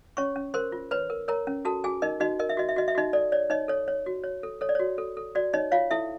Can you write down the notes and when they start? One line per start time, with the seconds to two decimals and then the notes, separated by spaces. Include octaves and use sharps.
0.17 C#4 C#5 C#6
0.36 C#4
0.54 A#4 C5 C6
0.72 F4
0.91 B4 C#5 B5
1.10 A#4
1.28 A#4 C#5 A#5
1.47 C#4
1.65 F#4 A4 A5
1.84 F#4 G#4 G#5
2.02 D#4 A#4 D#5
2.20 D#4 F#4 D#5
2.39 A#4 D#5
2.49 E5
2.57 F#4 D#5
2.69 E5
2.76 F#4 D#5
2.88 E5
2.95 D#4 F#4 D#5
3.13 A4 D5
3.32 C#5 D5
3.50 D#4 C#5 D#5
3.68 A4 C#5
3.88 C#5
4.06 F#4
4.24 C#5
4.43 A4
4.61 A4 C#5
4.69 D5
4.75 F#4 C#5
4.98 A4
5.17 A4
5.35 F#4 D5
5.53 D#4 C#5 D#5
5.71 F4 C#5 F5
5.91 E4 A4 E5